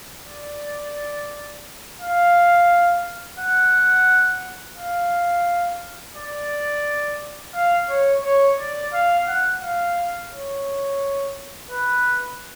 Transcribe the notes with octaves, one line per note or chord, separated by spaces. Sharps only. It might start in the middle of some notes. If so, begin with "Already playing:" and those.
D5
F5
F#5
F5
D5
F5
C#5
C#5
D5
F5
F#5
F5
C#5
B4